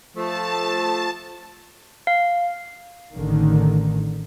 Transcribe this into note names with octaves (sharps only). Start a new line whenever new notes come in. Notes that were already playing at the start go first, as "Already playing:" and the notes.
F3 A3 A5
F5
A1 D3 D#3